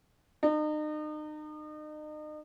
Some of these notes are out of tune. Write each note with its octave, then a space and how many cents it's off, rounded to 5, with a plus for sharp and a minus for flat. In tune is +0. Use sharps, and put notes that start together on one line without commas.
D#4 -35